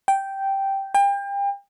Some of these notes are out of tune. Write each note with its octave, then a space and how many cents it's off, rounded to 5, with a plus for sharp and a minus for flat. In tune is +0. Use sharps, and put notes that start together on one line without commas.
G5 -5
G5 +35